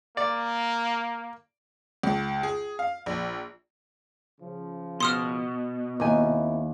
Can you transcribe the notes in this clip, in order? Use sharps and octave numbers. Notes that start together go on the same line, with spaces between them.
A#3 D5
C#2
G#4
F5
A#1
C#3 F3
B2 C6 D#6 F6
D#2 B3 C4 E4 G#5